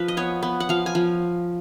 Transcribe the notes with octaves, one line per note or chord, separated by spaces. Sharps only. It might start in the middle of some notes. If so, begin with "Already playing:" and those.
Already playing: F3 B4
D#5
B3 C#5
B3
F#5
F3 F5
G#5
F3